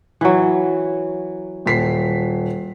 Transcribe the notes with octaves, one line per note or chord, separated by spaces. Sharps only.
E3 F#3
D#1 B6 C7